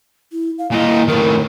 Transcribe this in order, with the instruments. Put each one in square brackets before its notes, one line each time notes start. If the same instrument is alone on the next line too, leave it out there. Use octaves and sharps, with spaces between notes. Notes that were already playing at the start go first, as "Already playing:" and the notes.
[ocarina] E4
F5
[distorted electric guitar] A#2 D#4 [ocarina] E4
[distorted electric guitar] A2 D#3 [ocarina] A#4